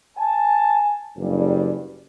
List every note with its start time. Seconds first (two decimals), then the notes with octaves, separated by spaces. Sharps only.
0.16 G#5 A5
1.17 F#1 G2